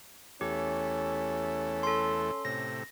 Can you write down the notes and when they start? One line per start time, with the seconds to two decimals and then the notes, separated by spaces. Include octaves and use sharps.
0.41 E2 A3 C#4 G4
1.83 A4 C6
2.45 A2 C3 A#6